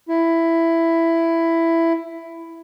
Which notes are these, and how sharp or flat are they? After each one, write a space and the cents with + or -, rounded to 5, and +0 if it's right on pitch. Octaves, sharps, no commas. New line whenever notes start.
E4 +10